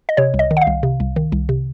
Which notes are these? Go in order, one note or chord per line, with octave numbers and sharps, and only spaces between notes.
D#5
C3 C#5
C2
D#5
D#3
F#5
F5
C2
C3
C2
D#3
C2
C3